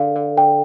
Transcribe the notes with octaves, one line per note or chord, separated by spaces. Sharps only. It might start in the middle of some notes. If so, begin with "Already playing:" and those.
Already playing: D3 F5
D3
D3 G5